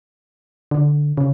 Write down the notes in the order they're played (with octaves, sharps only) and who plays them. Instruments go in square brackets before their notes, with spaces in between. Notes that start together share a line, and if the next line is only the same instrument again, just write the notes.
[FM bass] D3
C#3